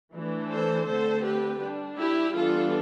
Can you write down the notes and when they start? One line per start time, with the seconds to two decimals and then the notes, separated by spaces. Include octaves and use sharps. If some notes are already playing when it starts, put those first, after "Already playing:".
0.13 E3 A3 D4
0.50 A4 C5
0.87 D3 A3 C4 A4 C5
1.24 G4 B4
1.61 G3 D4
1.97 E4 G4
2.34 E3 G3 B3 D4 F4 A4